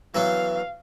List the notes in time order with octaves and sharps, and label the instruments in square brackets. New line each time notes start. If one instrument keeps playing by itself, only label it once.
[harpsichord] E3 F#3 B3 [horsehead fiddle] F5